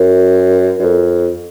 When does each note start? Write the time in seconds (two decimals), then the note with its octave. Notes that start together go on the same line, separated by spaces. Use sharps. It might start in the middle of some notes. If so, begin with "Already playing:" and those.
Already playing: F#2
0.79 F#2
0.84 F2